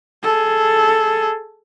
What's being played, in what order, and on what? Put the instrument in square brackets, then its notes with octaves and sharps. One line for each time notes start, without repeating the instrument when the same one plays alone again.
[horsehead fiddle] G#4 A4